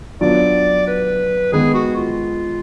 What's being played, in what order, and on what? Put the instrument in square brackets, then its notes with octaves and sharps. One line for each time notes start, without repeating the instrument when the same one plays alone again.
[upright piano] F#3 B3 D4 F4 [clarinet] D5
[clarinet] B4
[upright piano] D#3 G#3 B3 [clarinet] G#4
[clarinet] F#4
F4